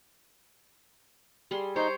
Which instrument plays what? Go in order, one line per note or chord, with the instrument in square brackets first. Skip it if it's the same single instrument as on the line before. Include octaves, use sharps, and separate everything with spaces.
[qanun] G3 G#4 C6
[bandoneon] D#4 [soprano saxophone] C5 [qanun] C#5 G5